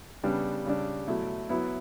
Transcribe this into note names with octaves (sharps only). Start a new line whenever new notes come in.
C#3 G3 B3 D4
C#3 G3 D4
B2 F#3 A3 E4
F#3 B3 E4